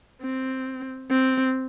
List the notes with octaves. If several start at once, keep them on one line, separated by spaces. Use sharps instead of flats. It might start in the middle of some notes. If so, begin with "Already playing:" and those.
C4
C4